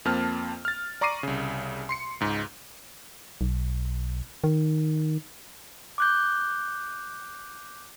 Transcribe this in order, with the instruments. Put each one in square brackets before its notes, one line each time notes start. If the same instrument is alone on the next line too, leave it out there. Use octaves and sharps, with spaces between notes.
[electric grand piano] F2 A#3 C4 A5 F6
F6 A6
D5 A#5 C#6 D6 C7 D#7
C2 C#3
C6 C7 C#7
C#2 G#2
[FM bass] B1
D#3
[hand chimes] D6 F#6 G6